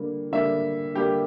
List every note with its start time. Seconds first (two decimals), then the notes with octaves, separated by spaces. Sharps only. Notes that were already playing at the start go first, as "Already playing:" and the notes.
Already playing: D3 G3 A#3
0.32 D3 G3 A#3 E5
0.94 D3 G3 A#3 G4